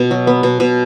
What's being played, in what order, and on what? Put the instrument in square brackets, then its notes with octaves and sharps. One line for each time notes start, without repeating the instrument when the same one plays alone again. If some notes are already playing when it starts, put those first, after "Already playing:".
Already playing: [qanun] B2 B3
F#3
B3
B2
B2